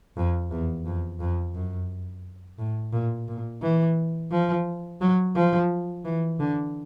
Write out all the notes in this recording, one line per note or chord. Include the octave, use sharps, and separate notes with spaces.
F2
E2
F2
F2
F#2
A2
A#2
A#2
E3
F3
F#3
F3
E3
D3